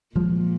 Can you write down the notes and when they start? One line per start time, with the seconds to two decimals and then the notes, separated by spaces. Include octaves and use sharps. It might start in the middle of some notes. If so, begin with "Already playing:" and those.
0.15 A#2 F3 G#3